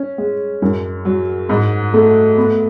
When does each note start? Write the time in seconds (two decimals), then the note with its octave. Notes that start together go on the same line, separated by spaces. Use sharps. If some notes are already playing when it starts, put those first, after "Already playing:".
Already playing: C#4
0.18 G#3
0.62 F#2
1.05 F#3
1.49 G#2
1.94 A3
2.37 B3